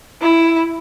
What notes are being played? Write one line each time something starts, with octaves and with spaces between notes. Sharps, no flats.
E4